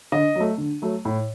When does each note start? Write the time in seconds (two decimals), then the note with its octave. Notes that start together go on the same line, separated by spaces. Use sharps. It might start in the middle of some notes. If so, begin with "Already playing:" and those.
0.12 D3 D#5
0.35 F#3 A3
0.58 D3
0.82 F#3 A3
1.05 A2